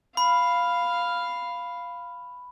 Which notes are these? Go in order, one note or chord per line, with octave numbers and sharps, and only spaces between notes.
F5 B5